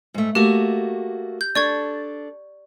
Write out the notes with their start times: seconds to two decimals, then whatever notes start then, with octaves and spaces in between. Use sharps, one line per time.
0.14 G#2 A3
0.35 A3 A#3 F#4 G4
1.41 G6
1.55 D4 A4 D5 C#6 G#6